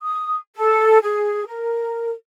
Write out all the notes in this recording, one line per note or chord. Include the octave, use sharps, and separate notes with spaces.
D#6
A4
G#4
A#4